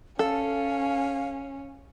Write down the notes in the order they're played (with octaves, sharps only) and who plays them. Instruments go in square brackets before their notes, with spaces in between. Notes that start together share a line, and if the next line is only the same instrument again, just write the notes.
[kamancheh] C#4 [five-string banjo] A4 [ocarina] F5